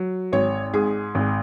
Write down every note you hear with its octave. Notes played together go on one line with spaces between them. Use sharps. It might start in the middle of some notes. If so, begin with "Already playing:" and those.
Already playing: F#3
G#1 C#5
G#2 G#4
G#1